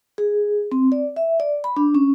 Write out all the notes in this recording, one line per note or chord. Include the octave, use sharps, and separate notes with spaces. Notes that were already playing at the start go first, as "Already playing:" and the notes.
G#4
C4
D5
E5
D5
B5
D4
C#4